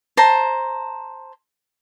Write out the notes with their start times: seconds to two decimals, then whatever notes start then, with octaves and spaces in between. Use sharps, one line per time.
0.17 C5 A5 A#5